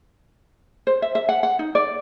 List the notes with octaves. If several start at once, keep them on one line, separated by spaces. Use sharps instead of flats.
C5
E5
E5
F#5
F#5
D#4
D5